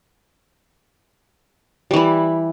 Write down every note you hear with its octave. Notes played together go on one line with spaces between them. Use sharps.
E3 G3 E4